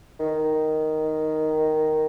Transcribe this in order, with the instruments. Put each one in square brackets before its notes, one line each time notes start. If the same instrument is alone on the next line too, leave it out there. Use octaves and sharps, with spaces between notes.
[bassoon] D#3